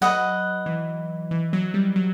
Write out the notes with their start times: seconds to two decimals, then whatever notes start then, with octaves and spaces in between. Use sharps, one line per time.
0.02 F#3 B4 D#5 F#5
0.66 E3
1.31 E3
1.53 F#3
1.74 G3
1.96 F#3